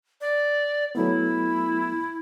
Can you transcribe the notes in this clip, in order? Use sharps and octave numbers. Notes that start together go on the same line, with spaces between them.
D5
F#3 A3 B3 E4